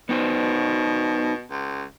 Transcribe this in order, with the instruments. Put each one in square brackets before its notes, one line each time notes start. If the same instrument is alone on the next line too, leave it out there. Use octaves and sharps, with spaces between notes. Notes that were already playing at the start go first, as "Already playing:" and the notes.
[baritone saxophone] B2 [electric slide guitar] B3 D#4 C5
[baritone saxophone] C#2